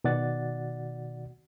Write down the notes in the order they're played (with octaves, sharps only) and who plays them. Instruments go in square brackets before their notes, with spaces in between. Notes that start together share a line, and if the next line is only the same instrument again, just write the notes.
[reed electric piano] B2 D#3 F#4 D5 F#5 A6